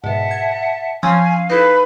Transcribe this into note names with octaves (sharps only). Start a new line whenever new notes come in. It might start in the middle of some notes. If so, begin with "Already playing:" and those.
G#2 B2 E5 F#5 A5
G#6
F3 C4 C#4 F5 G#5
D#4 E4 A4 B4